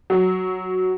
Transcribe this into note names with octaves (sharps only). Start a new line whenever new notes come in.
F#3